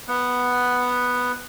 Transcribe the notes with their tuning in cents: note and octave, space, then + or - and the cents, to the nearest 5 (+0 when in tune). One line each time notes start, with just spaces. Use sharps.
B3 +0 F#5 +0